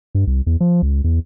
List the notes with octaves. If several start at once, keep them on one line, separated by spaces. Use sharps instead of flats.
G2
C2
E2
F3
C#2
E2